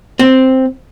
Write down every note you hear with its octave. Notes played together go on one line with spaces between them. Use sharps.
C4